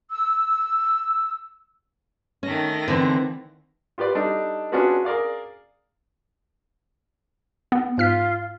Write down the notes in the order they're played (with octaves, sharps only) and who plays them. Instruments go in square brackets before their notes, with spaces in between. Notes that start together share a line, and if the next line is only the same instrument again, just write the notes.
[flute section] E6
[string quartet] D#3 A3 A#6 [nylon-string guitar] C#4
[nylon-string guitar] D3 E3 C4
[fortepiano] F4 G4 B4 D5
G3 D4 D#4 A4
C#4 D4 F4 F#4 G#4 B4
G#4 A#4 D5 F5
[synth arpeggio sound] B3
[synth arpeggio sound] G#2 F6 B6 [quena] F4